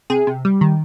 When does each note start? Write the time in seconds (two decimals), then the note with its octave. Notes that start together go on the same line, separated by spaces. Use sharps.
0.10 C3 G#4
0.27 C3
0.45 G3
0.61 D#3